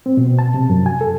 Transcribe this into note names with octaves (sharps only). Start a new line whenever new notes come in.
C4
B2
A5
C3
F#2
G#5
A4